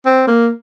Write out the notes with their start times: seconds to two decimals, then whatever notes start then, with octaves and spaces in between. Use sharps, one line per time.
0.06 C4
0.28 A#3